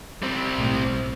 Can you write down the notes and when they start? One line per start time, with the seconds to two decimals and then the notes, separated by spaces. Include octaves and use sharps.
0.22 G3 C4
0.58 B1 A2